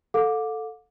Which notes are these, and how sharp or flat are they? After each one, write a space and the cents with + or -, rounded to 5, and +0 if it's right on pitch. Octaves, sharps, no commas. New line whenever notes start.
A4 +0 F5 +45 D6 +0